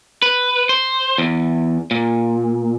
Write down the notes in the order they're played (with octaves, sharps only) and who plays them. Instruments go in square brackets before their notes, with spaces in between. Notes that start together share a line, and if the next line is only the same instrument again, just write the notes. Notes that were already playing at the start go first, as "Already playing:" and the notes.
[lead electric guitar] B4
C5
E2
A#2